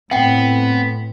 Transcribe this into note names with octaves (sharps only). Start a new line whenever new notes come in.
A2 B3 C4 F#5 G5